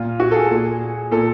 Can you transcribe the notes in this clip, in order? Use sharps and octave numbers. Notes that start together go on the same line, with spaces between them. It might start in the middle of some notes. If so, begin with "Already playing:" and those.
Already playing: A#2 F4
F#4
A4
G#4
A#2
A#2 A4